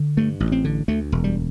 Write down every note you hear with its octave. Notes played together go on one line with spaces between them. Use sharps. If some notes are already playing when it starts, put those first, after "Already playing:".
Already playing: D3
G2 A3
A1
C4
D3
D2 A3
E1
G3